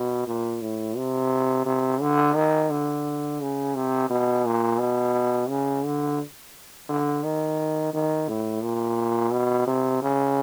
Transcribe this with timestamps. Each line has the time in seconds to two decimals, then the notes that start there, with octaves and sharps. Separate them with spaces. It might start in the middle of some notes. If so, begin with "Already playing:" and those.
Already playing: B2
0.27 A#2
0.62 A2
0.97 C3
1.66 C3
2.01 D3
2.35 D#3
2.70 D3
3.41 C#3
3.75 C3
4.10 B2
4.45 A#2
4.79 B2
5.49 C#3
5.85 D3
6.89 D3
7.24 D#3
7.94 D#3
8.29 A2
8.63 A#2
9.32 B2
9.67 C3
10.02 C#3